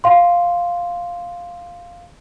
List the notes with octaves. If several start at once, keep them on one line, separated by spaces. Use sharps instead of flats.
F5 C6